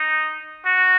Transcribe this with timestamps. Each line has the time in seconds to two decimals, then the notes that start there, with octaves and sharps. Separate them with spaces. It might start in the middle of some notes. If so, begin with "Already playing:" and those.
Already playing: D#4
0.65 F#4